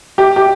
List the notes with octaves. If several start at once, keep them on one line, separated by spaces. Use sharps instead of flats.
G4
G4